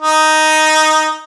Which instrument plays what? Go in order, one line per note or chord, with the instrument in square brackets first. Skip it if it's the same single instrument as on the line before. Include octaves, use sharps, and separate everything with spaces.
[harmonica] D#4